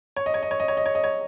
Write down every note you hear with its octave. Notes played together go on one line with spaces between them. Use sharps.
C#5
D#5
C#5
D#5
C#5
D#5
C#5
D#5
C#5
D#5
C#5